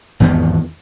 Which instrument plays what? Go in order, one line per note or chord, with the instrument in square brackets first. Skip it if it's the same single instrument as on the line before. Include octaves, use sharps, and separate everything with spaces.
[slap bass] G#1 E2 B3